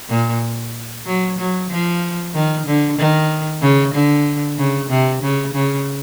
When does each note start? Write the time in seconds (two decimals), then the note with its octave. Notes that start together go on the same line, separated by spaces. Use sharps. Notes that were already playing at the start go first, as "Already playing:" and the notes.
0.09 A#2
1.06 F#3
1.38 F#3
1.70 F3
2.34 D#3
2.67 D3
2.99 D#3
3.61 C#3
3.94 D3
4.58 C#3
4.89 C3
5.22 C#3
5.54 C#3